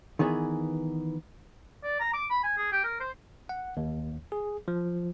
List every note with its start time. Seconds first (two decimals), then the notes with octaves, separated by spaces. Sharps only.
0.19 D#3 E3 B3 G#4
1.83 D5
2.00 A#5
2.13 D6
2.30 B5
2.44 G#5
2.57 G#4
2.72 G4
2.84 A#4
3.00 C5
3.49 F#5
3.77 D#2
4.32 G#4
4.68 F3